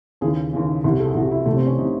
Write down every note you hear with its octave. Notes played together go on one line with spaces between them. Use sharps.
D#2 C#3 E3 G#4
D#2 C#3 E3
C2 C3 E3
A4
G#4
C2 C3 E3 F#4
E4
C2 C3 E3 A3
C4
C#4
C3 E3 D#4